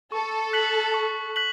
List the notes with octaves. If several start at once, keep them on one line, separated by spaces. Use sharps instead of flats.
A4 C#6
F#6 B6 F#7
C#6
F#6 B6 F#7